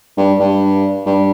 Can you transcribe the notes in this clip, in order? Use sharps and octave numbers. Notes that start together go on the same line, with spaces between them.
G2
G2
G2